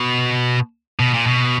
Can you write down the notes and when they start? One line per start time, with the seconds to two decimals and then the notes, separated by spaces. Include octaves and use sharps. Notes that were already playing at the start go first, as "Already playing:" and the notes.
Already playing: B2
0.99 B2
1.14 A#2
1.27 B2